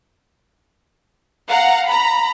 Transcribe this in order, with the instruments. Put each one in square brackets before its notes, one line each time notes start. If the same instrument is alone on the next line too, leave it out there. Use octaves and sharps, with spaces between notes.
[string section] F5 F#5 A#5
A#5 B5